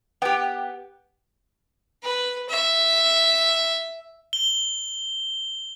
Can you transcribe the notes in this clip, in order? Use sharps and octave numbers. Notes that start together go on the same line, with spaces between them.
B3 G4 G5
B4
E5
G7